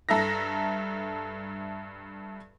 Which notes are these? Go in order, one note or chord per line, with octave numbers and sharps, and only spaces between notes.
G2 A4 E5 A#5 A#6